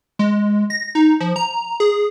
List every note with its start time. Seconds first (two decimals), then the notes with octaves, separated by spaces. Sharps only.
0.19 G#3
0.70 A#6
0.95 D#4
1.20 F3
1.36 A#5
1.80 G#4